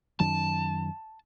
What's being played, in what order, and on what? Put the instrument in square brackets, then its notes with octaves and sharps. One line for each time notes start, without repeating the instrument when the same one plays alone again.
[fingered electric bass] F#2 D#3 F#3 [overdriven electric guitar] A5